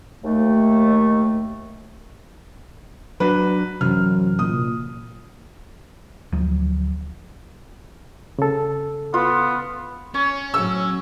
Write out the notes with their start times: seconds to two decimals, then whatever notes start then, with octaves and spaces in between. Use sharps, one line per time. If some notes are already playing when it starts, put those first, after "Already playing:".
0.24 D#2 A3
3.20 F#3 D4 F#4 B4
3.81 F#2 C3 E3 F#3 F6
4.39 A#2 D#6
6.32 D2 F3 F#3
8.39 C#3 A4
9.14 B3 F4
10.14 C#4 C#5
10.54 A2 F#3 E6